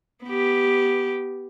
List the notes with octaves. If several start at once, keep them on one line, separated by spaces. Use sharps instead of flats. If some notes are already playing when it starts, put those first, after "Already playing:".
B3 G4